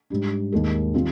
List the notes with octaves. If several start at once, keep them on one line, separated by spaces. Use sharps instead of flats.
G#2 G3 D4
D#2 D#3 G#3 D#4 A#4
D#3 G3 C4 F4